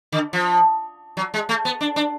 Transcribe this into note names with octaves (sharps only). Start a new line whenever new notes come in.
D3
F3
F#3
G#3
A3
B3
D4
D4